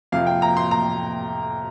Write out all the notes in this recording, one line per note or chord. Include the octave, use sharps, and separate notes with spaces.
F2 C3 F3 F5
G5
A#5
C6
A#5